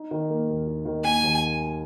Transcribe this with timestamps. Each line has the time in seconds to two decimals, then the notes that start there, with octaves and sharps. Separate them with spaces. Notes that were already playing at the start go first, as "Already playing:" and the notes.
Already playing: D#4
0.11 D#3
0.30 A#3
0.49 D#2
0.67 D#4
0.85 D#3
1.04 A#3 G#5
1.23 D#2